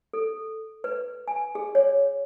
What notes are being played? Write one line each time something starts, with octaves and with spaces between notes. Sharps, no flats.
A4
B4
G#5
G#4
C#5